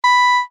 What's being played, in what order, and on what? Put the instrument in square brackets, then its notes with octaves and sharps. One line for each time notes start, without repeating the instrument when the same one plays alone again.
[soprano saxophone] B5